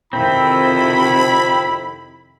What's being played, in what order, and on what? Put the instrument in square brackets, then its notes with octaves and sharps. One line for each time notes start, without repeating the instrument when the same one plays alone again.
[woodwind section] F2 E4 [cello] C3 D#3 [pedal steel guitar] C4 [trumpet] B5